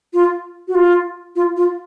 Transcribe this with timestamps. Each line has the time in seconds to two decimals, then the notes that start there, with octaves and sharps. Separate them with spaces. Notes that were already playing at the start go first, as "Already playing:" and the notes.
0.13 F4
0.68 F#4
0.75 F4
1.36 F4
1.56 F4